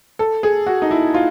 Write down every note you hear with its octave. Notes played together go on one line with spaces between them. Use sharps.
A4
G#4
F#4
D#4
E4
F4